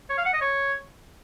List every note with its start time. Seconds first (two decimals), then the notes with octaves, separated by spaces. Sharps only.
0.10 C#5
0.17 F5
0.25 F#5
0.33 D#5
0.41 C#5